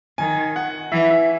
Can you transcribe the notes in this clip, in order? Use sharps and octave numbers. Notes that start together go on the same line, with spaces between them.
D#3 G#5
F#5
E3 E5
E5